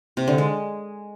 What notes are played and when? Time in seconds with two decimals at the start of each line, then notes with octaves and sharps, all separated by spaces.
0.17 C3
0.28 D3
0.38 G#3